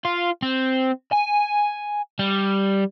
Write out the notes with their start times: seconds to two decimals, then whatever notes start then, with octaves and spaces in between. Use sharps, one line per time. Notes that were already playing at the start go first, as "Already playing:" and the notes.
0.05 F4
0.42 C4
1.13 G#5
2.19 G3